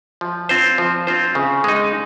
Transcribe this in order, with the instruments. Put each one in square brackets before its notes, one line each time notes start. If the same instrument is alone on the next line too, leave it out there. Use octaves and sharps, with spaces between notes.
[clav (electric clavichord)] F3
C4 F4 C5
F3
C4 F4 C5
C#3
G#3 D#4